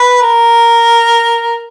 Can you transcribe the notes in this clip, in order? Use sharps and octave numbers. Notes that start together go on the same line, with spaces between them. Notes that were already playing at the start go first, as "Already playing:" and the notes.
Already playing: B4
A#4